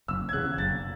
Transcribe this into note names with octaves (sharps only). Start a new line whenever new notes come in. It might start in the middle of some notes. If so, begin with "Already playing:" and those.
F#1 E6
G#6
E2 C#3 F#6
F#1 A6